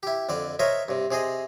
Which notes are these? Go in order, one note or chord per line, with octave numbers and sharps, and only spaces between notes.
E4 G4
F2 D3 D5
A#4 C5 C#5 D#5 E5
G2 C3
C3 G#4 C5 D#5